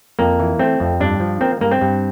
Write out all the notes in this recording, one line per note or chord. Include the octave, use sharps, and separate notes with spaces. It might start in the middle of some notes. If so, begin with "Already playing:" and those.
F2 A#3
E3
A3 C4
F2
G2 D4
F3
A#3 C4
G2 A#3
C4
G2